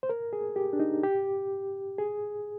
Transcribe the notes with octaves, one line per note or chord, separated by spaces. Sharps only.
C5
A#4
G#4
G4
D4
D#4
G4
G#4